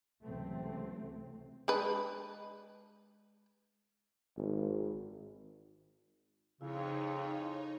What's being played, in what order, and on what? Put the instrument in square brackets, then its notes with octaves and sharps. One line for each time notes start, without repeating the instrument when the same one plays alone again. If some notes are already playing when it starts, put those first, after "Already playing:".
[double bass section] C#2 C3 E3 F#3 A3 C4
[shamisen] G#3 D4 B4
[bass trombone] G#1
[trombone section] F2 [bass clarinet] C#3 [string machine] D#4 C#5 [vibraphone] E4